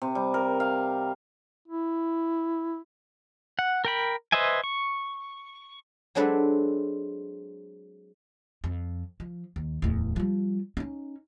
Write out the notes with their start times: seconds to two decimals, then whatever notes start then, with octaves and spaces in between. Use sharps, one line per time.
0.02 C3
0.15 G3
0.34 A#4
0.60 F5
1.68 E4
3.59 F#5
3.85 A#4 G5 B5
4.32 B4 C5 D#5 E5 G#5
4.64 C#6
6.15 F#3 G#3 C4 D4 A4 B4
8.64 F2
9.20 F3
9.56 D#2
9.82 D1 E2
10.16 F3 G3
10.77 C#4 D#4